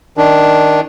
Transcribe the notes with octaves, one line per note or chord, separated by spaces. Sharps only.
D#3 D4